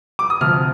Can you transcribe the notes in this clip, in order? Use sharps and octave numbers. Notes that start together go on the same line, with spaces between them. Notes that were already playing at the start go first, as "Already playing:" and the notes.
D6
D#6
D2 C3 F3 F6